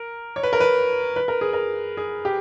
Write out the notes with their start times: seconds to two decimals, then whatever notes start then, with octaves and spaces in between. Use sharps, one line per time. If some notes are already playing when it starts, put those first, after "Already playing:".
Already playing: A#4
0.36 C#5
0.43 B4
0.53 A#4
0.60 B4
1.16 B4
1.28 A#4
1.41 G#4
1.53 A#4
1.97 G#4
2.25 G4